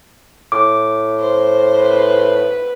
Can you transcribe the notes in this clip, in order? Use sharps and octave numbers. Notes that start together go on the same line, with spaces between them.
A2 D6
C5
B4